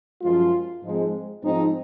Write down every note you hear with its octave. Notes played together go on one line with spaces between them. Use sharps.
F#2 F3 G#3 F4
G#2 F3 G#3 C4
G#2 F3 G#3 C4 D#4